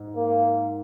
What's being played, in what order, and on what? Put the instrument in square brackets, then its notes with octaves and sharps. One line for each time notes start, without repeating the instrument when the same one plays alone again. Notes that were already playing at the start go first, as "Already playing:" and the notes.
Already playing: [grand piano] G#2
[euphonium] A#3